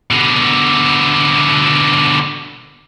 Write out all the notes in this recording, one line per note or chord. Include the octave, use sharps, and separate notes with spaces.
B2 D3